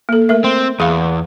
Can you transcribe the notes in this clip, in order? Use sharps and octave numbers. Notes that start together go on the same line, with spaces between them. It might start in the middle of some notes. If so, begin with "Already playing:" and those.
A#3 A4
A3 A#4 E5
C4
E2 G#4 F5